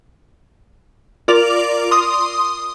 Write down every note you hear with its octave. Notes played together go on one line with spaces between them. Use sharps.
F4 A#4 D5 D6 F7
C6 D#6